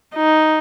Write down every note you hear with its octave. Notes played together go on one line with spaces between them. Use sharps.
D#4